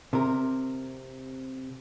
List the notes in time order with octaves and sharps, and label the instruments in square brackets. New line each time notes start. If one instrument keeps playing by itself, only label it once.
[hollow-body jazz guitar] C3 A#4